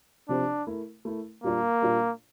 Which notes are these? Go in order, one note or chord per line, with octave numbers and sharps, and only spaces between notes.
C3 F3 C4 D4 G4 C5
A3 E4 A#4
A3 E4 A#4
A#2 G3 A#3 D4 F4 A#4
A#2 G3 D4 F4 A#4